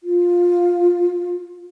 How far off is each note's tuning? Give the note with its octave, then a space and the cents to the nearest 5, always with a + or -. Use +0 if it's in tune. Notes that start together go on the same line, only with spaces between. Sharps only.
F4 +10